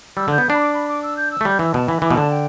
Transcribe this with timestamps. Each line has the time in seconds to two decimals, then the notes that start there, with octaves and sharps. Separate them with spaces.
0.17 G3 E6
0.28 D3 G6
0.38 B3
0.50 D4 B5
0.60 D6
0.74 B5
0.89 D6
1.03 E6
1.17 G6
1.31 E6
1.41 A3
1.45 G3 G6
1.59 E3 E6
1.73 B2 A5
1.88 E3 B5
2.02 E3 D6
2.11 B2
2.17 D3 A5
2.31 G5